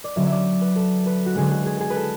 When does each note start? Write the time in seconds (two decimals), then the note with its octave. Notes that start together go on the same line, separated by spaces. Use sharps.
0.04 D5
0.16 D3 F#3 C#4 E5
0.26 E5
0.32 D5
0.61 B4
0.76 A4
1.06 B4
1.26 F#4
1.35 D3 G#3 C#4 G#4
1.51 G#4
1.66 G#4
1.81 G#4
1.90 B4
1.96 A4